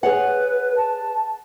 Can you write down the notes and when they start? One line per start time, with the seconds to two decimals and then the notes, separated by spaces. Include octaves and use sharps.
0.03 G#4 B4 C#5 F#5
0.77 A5